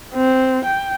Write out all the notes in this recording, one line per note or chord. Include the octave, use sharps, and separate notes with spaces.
C4
G5